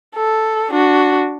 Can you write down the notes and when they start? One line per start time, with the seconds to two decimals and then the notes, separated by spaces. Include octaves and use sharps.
0.16 A4
0.70 D4 F#4